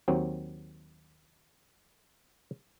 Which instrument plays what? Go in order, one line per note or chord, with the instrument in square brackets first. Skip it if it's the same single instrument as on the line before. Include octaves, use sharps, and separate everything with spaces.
[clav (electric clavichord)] D#2 F#3 C4